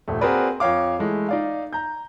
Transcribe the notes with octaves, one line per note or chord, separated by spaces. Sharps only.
D#1 A#1 A3
C4 F#4 G#4 A#4 B4 D5
F2 C#5 F5 D6
E3 G#3 A3
D#4 D5 F5
A#5 G6